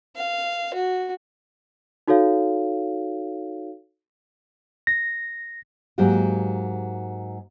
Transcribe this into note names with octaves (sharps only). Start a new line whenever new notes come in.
F5
F#4
D#4 F#4 A4 C#5 F5
A#6
G#2 F#3 A#3 F#4 G4